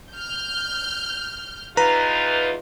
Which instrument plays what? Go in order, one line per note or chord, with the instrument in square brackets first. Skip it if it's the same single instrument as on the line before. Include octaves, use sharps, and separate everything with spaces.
[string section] F6 G6
[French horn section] E2 D#4 F4 [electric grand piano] B4 [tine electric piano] A#5